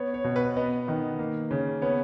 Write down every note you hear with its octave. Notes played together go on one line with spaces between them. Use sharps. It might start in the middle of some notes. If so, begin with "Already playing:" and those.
Already playing: B3 C#5
C#5
B2
B4
B3 D#5
D#3
A#3
C#3
B3 C#5